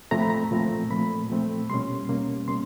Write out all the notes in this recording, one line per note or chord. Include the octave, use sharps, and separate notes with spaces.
A#2 F3 A3 C4 A#5
B5
A#5
A#2 F3 A3 C4
A#2 F3 A3 C4 B5
A#2 F3 A3 C4
B2 G3 A#3 C#4 C6
B2 G3 A#3 C#4
B2 G3 A#3 C#4 C6